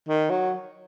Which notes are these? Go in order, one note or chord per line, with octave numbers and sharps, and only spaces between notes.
D#3
F#3